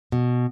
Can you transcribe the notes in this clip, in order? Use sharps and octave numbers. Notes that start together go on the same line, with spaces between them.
B2